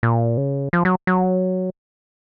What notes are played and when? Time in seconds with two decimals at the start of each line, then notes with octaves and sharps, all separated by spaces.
0.03 A#2
0.37 C#3
0.73 F3
0.85 F#3
1.07 F#3